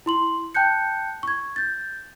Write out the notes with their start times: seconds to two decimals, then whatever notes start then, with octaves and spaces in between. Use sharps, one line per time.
0.06 E4 C6 F#7
0.55 G5 A5 F#6 G6 C#7
1.23 C#6 G#6
1.56 G6 A6